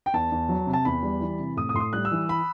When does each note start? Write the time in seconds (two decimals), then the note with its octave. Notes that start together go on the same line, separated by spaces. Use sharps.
0.06 G5
0.13 E2 A5
0.32 E2
0.49 F#3
0.67 C3
0.73 A5
0.85 E2 B5
1.03 G3
1.21 E3
1.39 C3
1.57 A2 D#6
1.69 D#6
1.74 A2 C6
1.80 D#6
1.93 G3 F#6
2.05 E6
2.11 E3
2.29 B5